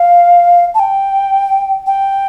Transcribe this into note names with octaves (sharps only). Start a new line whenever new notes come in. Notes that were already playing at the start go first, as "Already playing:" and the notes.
Already playing: F5
A5
G5
G5